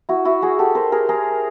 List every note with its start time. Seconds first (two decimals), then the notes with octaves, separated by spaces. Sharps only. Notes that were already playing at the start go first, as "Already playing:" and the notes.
0.09 E4 F#4
0.25 E4 F#4
0.42 F#4 G#4
0.59 G4 A4
0.75 A#4 C5
0.92 G#4 A#4
1.09 G#4 A#4